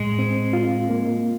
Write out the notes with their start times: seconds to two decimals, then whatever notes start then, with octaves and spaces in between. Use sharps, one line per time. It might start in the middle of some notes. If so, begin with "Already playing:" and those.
Already playing: A2 G#3
0.19 C4
0.53 F4
0.89 A#3